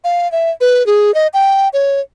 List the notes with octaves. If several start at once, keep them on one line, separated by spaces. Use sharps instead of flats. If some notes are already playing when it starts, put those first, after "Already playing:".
F5
E5
B4
G#4
D#5
G5
C#5